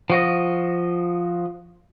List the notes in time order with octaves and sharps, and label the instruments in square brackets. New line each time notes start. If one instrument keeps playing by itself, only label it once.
[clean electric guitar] F3 F#4 D#5